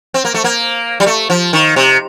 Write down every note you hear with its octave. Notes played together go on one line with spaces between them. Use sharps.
C4
A#3
A3
A#3
G3
A3
F3
D#3
C3